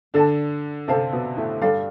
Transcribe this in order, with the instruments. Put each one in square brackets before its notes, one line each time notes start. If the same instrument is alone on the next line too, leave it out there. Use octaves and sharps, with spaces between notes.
[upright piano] D3 D4 [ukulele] A4 D5 A5
[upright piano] C3 C4 [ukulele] A4 C5 F5 A5
[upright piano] B2 B3
A2 A3
[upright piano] G2 G3 [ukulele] A4 D5 F5